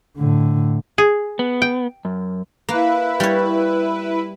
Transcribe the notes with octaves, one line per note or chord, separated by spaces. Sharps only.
A2 D3
G#4
B3
G5
F#2
A#3 E4 B4
G3 C#5